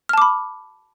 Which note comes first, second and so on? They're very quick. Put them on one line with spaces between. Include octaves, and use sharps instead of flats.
F6 A5 D6 B5